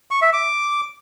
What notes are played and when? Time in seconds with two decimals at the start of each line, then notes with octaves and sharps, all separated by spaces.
0.11 C#6
0.22 E5
0.33 D6